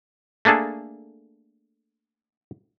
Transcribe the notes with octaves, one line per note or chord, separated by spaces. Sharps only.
A3 A#3 D4 G#4 A4